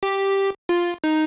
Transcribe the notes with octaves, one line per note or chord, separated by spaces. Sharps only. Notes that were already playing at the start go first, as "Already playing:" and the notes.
G4
F4
D#4